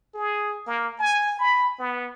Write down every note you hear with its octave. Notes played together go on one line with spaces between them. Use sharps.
G#4
A#3
G#5
B5
B3